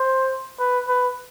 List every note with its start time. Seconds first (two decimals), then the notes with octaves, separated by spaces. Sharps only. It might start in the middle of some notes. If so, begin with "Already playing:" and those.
Already playing: C5
0.59 B4
0.88 B4